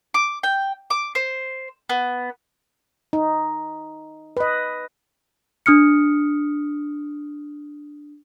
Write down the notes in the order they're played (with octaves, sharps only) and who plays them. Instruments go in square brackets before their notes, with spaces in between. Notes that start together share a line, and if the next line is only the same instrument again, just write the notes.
[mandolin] D6
G5
D6
C5
B3
[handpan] D#4
B4 D#5
[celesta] D4 D#6 F6 C#7